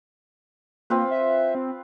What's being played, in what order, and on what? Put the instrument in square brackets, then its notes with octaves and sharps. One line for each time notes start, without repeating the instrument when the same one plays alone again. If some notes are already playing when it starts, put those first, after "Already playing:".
[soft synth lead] A#3 [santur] C4 F4 B4
[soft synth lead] E5
C4